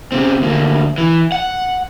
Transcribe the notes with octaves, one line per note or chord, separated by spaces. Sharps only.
C#3 C4
D2 A#3
E3
F#5